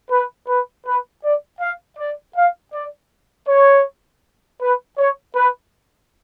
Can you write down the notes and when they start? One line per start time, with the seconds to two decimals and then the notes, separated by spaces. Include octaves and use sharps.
0.11 B4
0.48 B4
0.86 B4
1.23 D5
1.61 F5
1.99 D5
2.36 F5
2.73 D5
3.48 C#5
4.62 B4
4.98 C#5
5.36 B4